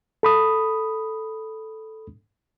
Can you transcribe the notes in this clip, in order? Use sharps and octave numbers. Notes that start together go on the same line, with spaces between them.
A4 B5 D#6